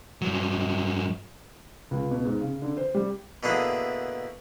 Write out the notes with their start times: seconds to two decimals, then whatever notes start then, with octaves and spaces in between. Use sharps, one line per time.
0.22 G2 F#3
1.91 C#2
2.11 B2
2.25 G#2
2.41 C#3
2.62 D3
2.77 C5
2.95 G3
3.43 B2 D3 A#3 D4 E4 G#4